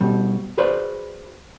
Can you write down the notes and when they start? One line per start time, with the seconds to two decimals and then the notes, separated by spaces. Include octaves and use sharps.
0.01 B2 G3
0.57 F#4 G#4 B4 C5 D5